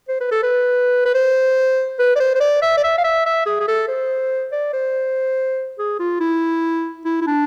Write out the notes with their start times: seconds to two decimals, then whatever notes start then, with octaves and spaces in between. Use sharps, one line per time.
0.08 C5
0.21 B4
0.31 A4
0.43 B4
1.05 B4
1.14 C5
1.99 B4
2.16 D5
2.20 C5
2.35 C5
2.40 D5
2.62 E5
2.77 D5
2.83 E5
2.98 F5
3.04 E5
3.26 E5
3.46 G#4
3.60 G#4
3.68 A4
3.88 C5
4.52 D5
4.73 C5
5.79 G#4
5.99 F4
6.20 E4
7.05 E4
7.21 E4
7.27 D4